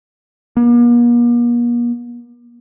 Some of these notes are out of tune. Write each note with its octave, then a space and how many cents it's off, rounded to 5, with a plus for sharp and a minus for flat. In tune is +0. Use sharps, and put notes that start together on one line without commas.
A#3 +45